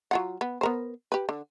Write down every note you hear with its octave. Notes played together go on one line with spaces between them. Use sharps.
F#3 F4 F#5
B3
B3 A#4 C5
G4 B4
D3